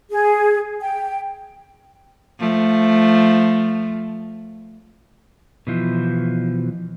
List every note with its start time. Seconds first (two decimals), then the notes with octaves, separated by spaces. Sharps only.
0.11 G#4
0.81 G5
2.39 F3 A3
5.67 B2 E3 F3